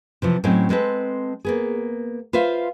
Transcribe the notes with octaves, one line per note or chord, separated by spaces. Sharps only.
C3 E3 F3
A2 F#3 C4 C#4 D#5 G5
G#3 C4 A4 B4
A#3 B3 G#4
F4 B4 C5 E5 F5